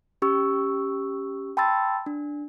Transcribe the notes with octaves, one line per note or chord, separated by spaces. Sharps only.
C#4 G4 C#6 E6
G5 A5 B5 C6 E6 A6
D4